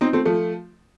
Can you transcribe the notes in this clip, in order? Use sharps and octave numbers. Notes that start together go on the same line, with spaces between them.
C4 D#4
A3 C4
F3 A3